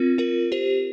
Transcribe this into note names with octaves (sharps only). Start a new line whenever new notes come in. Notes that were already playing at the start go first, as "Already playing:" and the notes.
Already playing: C4 F4 A#4
F4 A#4
G4 C5